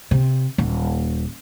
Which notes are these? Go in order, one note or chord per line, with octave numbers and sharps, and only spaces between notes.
C3
D#1